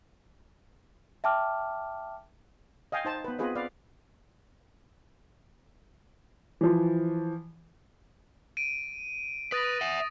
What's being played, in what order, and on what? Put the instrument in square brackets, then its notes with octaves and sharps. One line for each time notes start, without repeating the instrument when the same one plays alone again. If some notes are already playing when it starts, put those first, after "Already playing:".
[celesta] E5 G5 A5 D6 F6
[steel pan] D#5 F5 G5 G#5
D#4 C5 A5
B3 B4
B3 C4 F4 G#4 B4 D#5
B4 D5 F5
[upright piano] E3 F3
[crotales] D7 D#7
[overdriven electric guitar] B4 [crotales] D#6 A6 A#6
[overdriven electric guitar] E5 F#5